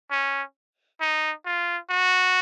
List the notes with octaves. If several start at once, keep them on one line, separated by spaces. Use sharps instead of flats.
C#4
D#4
F4
F#4